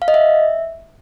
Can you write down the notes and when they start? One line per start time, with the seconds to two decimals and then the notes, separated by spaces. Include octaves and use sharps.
0.02 F5
0.08 D#5
0.14 E5